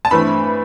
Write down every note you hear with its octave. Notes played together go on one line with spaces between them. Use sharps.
A5
G2 E3 A3 C4 B5